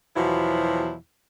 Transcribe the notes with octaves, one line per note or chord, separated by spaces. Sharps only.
E2 B2 F3 F#3 E4